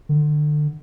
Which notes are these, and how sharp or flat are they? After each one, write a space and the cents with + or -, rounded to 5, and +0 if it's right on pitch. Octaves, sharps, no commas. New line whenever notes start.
D3 +30